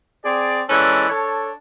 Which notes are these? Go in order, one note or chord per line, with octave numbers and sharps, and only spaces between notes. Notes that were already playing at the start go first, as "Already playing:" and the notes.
C4 G#4 D5
E3 G#3 C#4 A4 D5
D4 A4 C#5